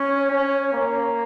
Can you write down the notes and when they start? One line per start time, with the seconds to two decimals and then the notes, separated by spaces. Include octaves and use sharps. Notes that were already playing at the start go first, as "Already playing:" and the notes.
Already playing: C#4 C#5
0.31 C#4
0.73 A#3